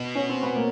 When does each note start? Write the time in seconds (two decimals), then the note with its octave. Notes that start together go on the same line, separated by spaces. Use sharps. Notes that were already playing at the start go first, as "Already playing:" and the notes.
Already playing: B2
0.15 C#4
0.29 C4
0.43 B3
0.56 A#3